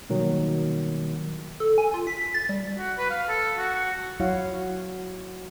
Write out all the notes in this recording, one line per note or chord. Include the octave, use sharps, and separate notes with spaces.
B2 D#3 F#3 G3 A#3
A4
G#5
F4
B6
A6
G3
F#4
B4
F5
A4
F#4
F#3 E4 F#4 C#5 F5 F#5